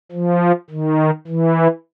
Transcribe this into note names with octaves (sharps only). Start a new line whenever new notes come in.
F3
D#3
E3